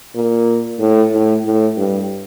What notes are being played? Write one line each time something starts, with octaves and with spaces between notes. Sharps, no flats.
A#2
A2
A2
A2
G2